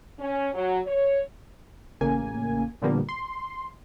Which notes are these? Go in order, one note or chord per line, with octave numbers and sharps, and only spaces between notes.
C#4
F#3
C#5
A1 C#3 A#3 G#5
A#2 D3 F3 G3 A#3 B3
C6